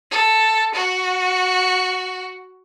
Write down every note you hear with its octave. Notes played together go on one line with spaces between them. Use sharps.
A4
F#4